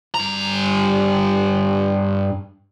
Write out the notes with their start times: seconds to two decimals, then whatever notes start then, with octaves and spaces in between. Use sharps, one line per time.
0.15 G2 A#5